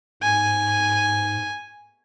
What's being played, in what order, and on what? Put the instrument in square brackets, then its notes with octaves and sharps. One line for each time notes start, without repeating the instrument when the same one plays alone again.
[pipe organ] G#2 [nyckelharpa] G#5